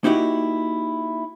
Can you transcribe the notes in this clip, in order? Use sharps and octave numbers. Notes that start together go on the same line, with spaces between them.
A#3 D#4 E4 F#4 G4